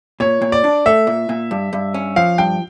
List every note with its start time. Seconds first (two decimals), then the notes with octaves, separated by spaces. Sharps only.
0.20 A#2 C#5
0.42 A#2
0.52 D5
0.64 D4
0.86 A3 E5
1.07 A#2
1.29 A#2
1.51 G2
1.73 G2
1.94 C#4
2.16 F3 F5
2.38 G2 G5